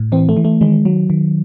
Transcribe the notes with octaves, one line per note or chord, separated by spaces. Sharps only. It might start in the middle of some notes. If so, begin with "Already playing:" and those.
Already playing: A2
E3 C4
A3
E3
A3
D#3 G#3
D#3 F#3
D#3